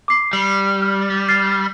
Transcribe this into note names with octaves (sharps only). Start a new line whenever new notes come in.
D6 C7
G3
F6
F6 A6 C7